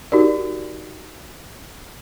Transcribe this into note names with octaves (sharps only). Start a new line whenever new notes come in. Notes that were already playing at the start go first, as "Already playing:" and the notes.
D#4 F#4 G4 A#4 D5